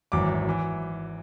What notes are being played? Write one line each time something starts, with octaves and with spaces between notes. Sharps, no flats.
G#1 F#2 E3 D6
E3